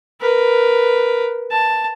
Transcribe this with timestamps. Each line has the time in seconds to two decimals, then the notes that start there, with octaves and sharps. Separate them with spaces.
0.21 A#4 B4
1.51 A5